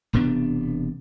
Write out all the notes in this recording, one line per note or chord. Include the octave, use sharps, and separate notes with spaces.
E1 C3 B3 D4